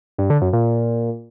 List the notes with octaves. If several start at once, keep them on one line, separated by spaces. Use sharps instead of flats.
G2
D3
F#2
A#2